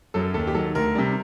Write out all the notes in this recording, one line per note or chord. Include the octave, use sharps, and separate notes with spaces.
F#2 F#3 A4
D#2 A4
G4
D#3 F#3 A4
D2 A#4
C3 G3